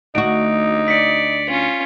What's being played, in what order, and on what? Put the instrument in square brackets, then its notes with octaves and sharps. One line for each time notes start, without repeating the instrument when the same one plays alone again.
[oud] D2 F#4 [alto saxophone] D#4 [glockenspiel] D7
[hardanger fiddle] D5 [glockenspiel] B6 C#7
[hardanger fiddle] C#4 F4